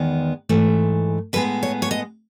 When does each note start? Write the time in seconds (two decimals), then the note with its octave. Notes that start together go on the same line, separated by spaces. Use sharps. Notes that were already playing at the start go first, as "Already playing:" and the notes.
Already playing: E2 D#3 G#3 B3
0.49 G#2 E3 A3
1.33 A2 G#3 B3 B4
1.63 C#5
1.82 C#5
1.91 D#5